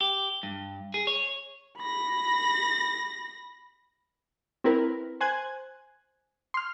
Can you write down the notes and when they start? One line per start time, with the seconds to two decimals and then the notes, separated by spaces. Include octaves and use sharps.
0.01 G4
0.43 G2
0.94 G#4
1.07 C#5
1.78 B5 A#6
4.64 C4 E4 A#4 B4
5.21 C5 G#5 F#6 G#6
6.54 C6 F6